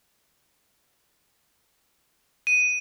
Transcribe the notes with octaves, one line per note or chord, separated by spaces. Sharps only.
D#7